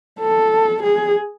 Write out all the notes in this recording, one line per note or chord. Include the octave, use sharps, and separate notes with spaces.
A4
G#4